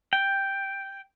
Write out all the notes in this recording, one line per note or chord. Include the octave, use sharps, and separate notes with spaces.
G5